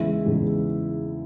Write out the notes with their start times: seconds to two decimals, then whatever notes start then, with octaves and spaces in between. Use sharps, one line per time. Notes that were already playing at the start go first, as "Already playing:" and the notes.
Already playing: E2 C#3 E3 G#3 E4
0.26 E2 C#3 E3 G#3